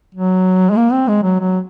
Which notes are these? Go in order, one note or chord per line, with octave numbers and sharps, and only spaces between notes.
F#3
G#3
A#3
C4
G#3
F#3
F#3